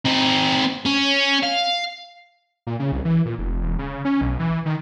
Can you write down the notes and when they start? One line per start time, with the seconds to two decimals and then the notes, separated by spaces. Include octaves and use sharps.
0.05 C4 D#4
0.86 C#4
1.43 F5
2.67 A#2
2.79 C#3
2.92 C2
3.05 E3
3.26 A#2
3.38 F1
3.62 E1
3.79 C#3
4.05 C#4
4.21 B1
4.39 E3
4.66 D#3